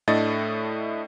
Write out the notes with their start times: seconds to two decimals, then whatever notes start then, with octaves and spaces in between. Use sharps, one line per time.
0.08 A2 A3 D4 D#5 A6